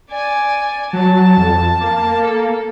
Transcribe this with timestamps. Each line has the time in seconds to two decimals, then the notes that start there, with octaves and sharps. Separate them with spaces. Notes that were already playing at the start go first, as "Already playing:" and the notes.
0.10 D5 G#5
0.93 F#3 A5
1.37 F2
1.80 A#3
2.24 A4